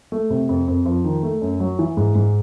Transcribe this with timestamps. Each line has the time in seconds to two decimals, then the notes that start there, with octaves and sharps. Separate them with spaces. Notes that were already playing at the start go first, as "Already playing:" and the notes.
0.12 A3
0.30 C3
0.49 F2
0.67 F2
0.86 F3
1.04 D#3
1.23 A3
1.42 F#2
1.60 F#3
1.79 E3
1.97 G#2
2.15 G#2